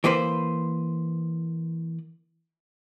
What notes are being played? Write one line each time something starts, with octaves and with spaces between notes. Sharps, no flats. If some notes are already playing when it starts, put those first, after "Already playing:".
E3 A#3 B4 C5